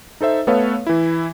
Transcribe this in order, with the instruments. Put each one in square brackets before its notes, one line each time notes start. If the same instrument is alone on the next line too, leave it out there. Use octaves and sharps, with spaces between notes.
[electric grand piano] D#4 A4 C5 E5
A3 B3 A4 B4 C#5 F5
E3 E4